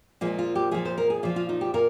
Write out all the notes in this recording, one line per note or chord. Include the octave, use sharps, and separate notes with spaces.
A#2 F3 G#3
F4
G4
A#2 F3 G#4
C5
A#4
G#4
A#2 F3 F4
F4
D#4
G4
A#2 A#4